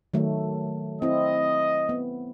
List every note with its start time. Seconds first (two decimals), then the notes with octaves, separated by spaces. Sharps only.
0.14 D#3 F#3 A3
1.02 C4 E4 D#5
1.89 B3